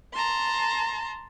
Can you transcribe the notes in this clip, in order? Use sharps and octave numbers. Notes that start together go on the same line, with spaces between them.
A5 A#5 C6